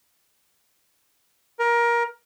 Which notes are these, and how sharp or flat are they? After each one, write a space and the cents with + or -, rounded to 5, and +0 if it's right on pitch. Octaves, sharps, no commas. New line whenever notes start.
A#4 +20